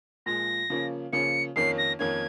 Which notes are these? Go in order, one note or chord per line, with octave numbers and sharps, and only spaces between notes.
A#2 F3 G#3 A#6
C#3 F3 A#3 C#4
C#3 F3 A#3 C#4 C#7
F2 D#3 A#3 C#4 C7
A#6
F2 D#3 A#3 C#4 G#6